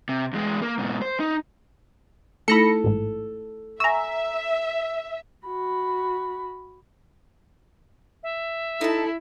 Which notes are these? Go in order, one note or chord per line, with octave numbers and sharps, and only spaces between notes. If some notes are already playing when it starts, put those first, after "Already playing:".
C3
E2 G#3
A#3
G#2 B2
C5
D#4
A3 D#4 E4 A4 B5 A#6 C#7
A1 G#2
E5 G#5 A#5 C#6 E6
F#4 B5
E5
D#4 E4 A4 A5